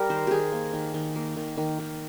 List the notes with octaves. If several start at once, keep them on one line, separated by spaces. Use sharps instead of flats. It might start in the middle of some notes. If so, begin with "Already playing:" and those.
Already playing: G3 G4 A#4
D#3 C5
D#3 G4 G#4
A#3
D#3
D#3
A#3
D#3
D#3
D#3